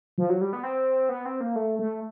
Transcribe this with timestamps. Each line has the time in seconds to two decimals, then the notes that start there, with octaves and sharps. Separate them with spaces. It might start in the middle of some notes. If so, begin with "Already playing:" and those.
0.18 F3
0.29 F#3
0.41 G3
0.53 B3
0.63 C4
1.09 B3
1.25 C4
1.41 A#3
1.56 A3
1.79 A3